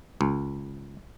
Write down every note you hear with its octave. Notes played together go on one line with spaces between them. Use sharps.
C#2